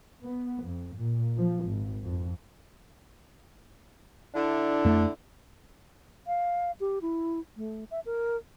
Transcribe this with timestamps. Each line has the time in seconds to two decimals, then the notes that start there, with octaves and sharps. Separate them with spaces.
0.22 B3
0.65 F2
0.97 A#2
1.38 F3
1.67 G#1
2.03 F2
4.35 D3 D4 E4
4.85 F2 A3
6.27 F5
6.80 G4
7.02 E4
7.57 A3
7.91 E5
8.06 A#4